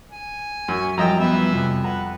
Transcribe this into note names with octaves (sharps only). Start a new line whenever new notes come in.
G#5
F#2 C#6
F#2 F3 G3 D#5 G5 A#5 E6 A6
E3 B3 E5 B5
F2 C3
B4 F#5 A#5